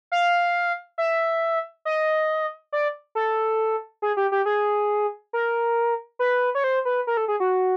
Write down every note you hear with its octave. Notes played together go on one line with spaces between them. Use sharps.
F5
E5
D#5
D5
A4
G#4
G4
G4
G#4
A#4
B4
C#5
C5
B4
A#4
A4
G#4
F#4